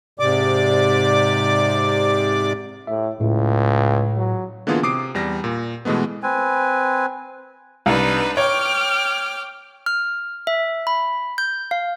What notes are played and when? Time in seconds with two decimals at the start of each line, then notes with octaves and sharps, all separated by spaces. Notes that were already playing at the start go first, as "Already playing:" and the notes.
0.19 G#2 C3 D5 D6
2.87 A2 E5
3.21 C#2 A2
4.17 F#3
4.67 D3 E3 A#3 B3 F4 G#4
4.83 C3 D6 D#6 C7 D7
5.15 E2 G3 A#6
5.44 A#2
5.85 B2 E3 G#3 A3 B3
6.23 C4 B4 G#5
7.86 C2 D4 D#4 B4
8.37 C#5 G5 D6 F6
9.86 F6
10.47 E5
10.87 B5
11.38 G6
11.71 F5